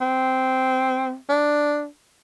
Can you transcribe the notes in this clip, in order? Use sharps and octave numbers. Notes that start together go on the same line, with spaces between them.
C4
D4